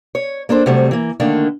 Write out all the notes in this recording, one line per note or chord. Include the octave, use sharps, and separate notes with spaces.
C#5
A#3 D4 A4 C5
C3 F#3 G3 A3 C4
E3 A#3
D3 D#3 A3 A#3 D4